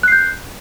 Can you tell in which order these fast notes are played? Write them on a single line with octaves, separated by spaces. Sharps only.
F#6 C7 G6